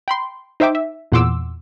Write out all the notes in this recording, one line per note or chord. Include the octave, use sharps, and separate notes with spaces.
G5 B5 C6
D#4 C5 E5 G5 D6
E5
E2 A#2 F#5 C6 D6 E6